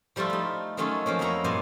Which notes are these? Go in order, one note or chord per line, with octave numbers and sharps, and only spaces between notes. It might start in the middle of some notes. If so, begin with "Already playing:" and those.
F3 G3 A3 E4 F4
A3 D#4
D#3 F#3 A3 C#4 D#4 F4
F3 A3 A#3 C#4
F2 D#4 E4 F#4 C#5 A#5
G2 A#2 G#5